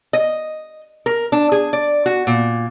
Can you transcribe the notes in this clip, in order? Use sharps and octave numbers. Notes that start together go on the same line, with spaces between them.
D#5
A#4
D4
G#4
D5
F#4
A#2